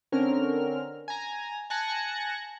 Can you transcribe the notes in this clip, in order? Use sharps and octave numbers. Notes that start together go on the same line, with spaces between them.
D3 C4 C#4 A#4 F6
G#5 A#5
G#5 A5 F#6 G#6 A#6 C#7